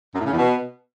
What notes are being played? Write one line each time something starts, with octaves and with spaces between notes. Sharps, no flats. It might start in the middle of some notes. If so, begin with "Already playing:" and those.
F#2
A2
C#3
E2
B2